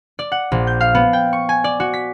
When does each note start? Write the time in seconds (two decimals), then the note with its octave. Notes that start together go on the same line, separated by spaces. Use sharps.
0.19 D5
0.32 F#5
0.52 A#1
0.67 G6
0.81 F5
0.95 B3
1.13 G5
1.33 C#6
1.49 G#5
1.64 D5
1.80 F#4
1.94 B6